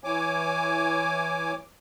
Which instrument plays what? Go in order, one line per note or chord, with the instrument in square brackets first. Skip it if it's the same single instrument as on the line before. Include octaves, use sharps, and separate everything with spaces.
[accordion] E3 C#5 G#5 D6